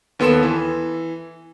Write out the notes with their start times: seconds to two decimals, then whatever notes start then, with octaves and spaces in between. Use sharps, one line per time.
0.19 D#2 B3 A4 C6 E7
0.43 E3